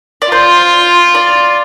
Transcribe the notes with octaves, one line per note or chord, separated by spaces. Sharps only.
D5
F4 C5
D5